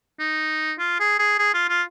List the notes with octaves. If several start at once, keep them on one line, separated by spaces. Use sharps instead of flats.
D#4
F4
G#4
G#4
G#4
F4
F4